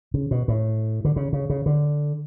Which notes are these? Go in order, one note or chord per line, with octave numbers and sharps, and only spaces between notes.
C#3
B2
A2
D3
C#3
C#3
C#3
D3